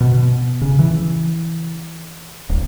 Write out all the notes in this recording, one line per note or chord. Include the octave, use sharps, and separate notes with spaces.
B2
C#3
E3
D1